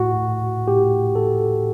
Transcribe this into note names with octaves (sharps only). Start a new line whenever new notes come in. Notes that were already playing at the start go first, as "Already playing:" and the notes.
Already playing: A2 F#4
A2 G4
A4